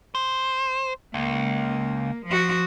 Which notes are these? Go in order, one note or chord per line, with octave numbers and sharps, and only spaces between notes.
C5
C#2 A#3
F3 F#4